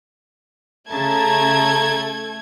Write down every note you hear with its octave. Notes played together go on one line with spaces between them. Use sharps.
C#3 A3 A4 A5 A#5 G#6